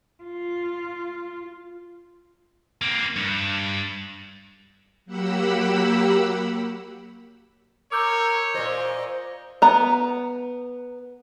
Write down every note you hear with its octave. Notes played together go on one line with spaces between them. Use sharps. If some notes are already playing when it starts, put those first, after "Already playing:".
F4
A#3 C4
G2
F#3 A#3 G4 F#5 B5 E6
A#4 C#5 D6 E6 G6
A#2 C5 D#5
B3 A#5